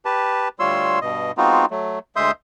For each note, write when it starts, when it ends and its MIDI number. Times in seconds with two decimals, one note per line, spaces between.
0.05 0.48 67
0.05 0.48 71
0.05 0.48 81
0.60 0.99 38
0.60 0.99 55
0.60 0.99 65
0.60 0.99 73
0.60 0.99 84
0.60 0.99 88
1.01 1.32 43
1.01 1.32 47
1.01 1.32 75
1.38 1.65 56
1.38 1.65 59
1.38 1.65 60
1.38 1.65 63
1.38 1.65 65
1.38 1.65 66
1.71 1.99 54
1.71 1.99 57
2.16 2.31 38
2.16 2.31 56
2.16 2.31 76
2.16 2.31 84
2.16 2.31 87
2.16 2.31 91